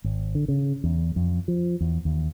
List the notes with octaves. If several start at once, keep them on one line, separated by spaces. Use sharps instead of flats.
G#1
D3
C#3
E2
F2
F3
E2
D#2